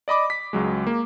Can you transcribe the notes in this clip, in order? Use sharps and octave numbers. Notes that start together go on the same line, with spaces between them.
D5 D#5 B5 D6
B6
C#2 F#3 G#3
A#3